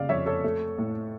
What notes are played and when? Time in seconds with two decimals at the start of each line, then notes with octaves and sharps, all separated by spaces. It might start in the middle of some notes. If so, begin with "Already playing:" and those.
Already playing: C#3 D5 F5
0.09 F2 C#5 E5
0.26 A4 C#5
0.44 A3
0.78 A2